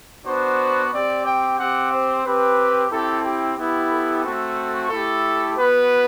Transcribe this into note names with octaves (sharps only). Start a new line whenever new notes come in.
B3 D4 F#4 C5
C4 G4 D5
G5
C4 G4 F#5
C5
C4 G4 B4
C4 E4 G4 A4
G4
B3 E4 G4
A4
A3 C4 F#4
A3 E4 G4 A4
B3 F#4 B4